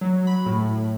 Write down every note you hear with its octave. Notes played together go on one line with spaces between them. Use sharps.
F#3
B5
A2